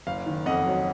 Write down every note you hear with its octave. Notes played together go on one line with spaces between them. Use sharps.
F#1 F5
D#3
F2 D#5 F#5
F#3